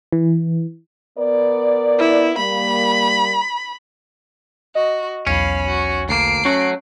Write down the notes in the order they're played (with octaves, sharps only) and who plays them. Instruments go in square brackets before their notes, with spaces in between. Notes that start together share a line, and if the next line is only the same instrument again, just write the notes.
[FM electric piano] E3
[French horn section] B3 A#4 D5
[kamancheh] E4
[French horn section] G3 A#3 [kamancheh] B5
[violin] F#4 [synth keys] D#5
[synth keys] B1 E2 [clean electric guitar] C#4 [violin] F5 B5
[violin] F#4
[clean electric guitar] D2 A#3 [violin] C7 D7
[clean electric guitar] F#3 A3 F#4 [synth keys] C#4